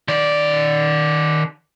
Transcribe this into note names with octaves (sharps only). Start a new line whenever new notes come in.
D#3 D5